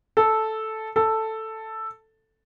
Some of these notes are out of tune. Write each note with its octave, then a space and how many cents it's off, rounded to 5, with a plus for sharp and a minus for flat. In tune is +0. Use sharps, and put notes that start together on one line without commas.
A4 -5
A4 +5